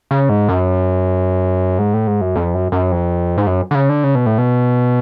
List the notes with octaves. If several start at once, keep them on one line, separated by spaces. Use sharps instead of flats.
C#3
G#2
F#2
G#2
A2
G#2
F#2
F2
F#2
F#2
F2
G#2
F#2
D3
C#3
D3
C#3
B2
A2
B2